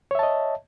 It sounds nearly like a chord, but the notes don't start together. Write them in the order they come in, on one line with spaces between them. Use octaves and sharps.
C#5 E5 A5 D#5